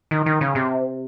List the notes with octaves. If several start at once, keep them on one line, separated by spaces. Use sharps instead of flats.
D#3
D#3
C#3
C3